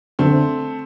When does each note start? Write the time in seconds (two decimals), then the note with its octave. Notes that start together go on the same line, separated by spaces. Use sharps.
0.19 D3 A3 C4